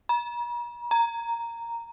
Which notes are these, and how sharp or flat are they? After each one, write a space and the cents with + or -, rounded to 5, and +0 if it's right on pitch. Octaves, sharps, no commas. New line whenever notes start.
A#5 +45
A#5 -5